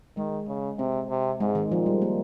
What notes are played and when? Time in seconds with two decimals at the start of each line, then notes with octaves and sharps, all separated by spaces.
0.17 D#3 G#3
0.48 C#3
0.79 C3 C4
1.10 C3
1.40 G#2 G#3
1.55 D#3
1.71 A#2 F3
1.86 G3
2.02 A#3